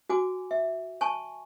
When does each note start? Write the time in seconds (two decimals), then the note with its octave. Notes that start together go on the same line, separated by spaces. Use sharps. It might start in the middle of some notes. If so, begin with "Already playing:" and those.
0.10 F#4 G#5 D6
0.51 E5
1.01 G#5 A5 C#6